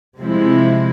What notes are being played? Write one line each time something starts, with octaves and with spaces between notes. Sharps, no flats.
C3 F3 G#3 C4 E4